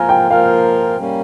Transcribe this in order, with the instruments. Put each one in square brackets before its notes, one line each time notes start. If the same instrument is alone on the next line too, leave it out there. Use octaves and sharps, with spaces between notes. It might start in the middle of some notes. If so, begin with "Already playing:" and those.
Already playing: [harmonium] F3 A#3 F4 A#4 [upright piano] G#5 A#5
[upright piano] G5
[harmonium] F3 A#3 F4 A#4 [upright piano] F5
[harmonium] G3 A#3 C#4